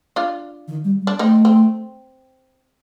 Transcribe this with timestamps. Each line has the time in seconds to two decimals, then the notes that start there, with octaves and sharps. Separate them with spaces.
0.16 D4 F4
0.68 D#3
0.84 G3
1.02 G3
1.07 D4
1.19 A3 C4 D#4
1.45 C4